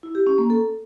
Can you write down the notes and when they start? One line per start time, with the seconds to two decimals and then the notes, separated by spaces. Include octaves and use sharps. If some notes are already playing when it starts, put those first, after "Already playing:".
0.03 E4
0.15 G4
0.27 C#4
0.38 A#3
0.50 A4